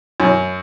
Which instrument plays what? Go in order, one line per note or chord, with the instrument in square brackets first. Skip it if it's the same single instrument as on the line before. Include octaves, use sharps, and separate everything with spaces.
[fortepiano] F#2